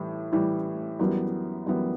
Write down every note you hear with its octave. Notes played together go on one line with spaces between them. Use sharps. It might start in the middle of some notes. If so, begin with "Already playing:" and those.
Already playing: A2 E3 G3
A2 E3 G3
F#2 E3 G3 B3
F#2 E3 G3 B3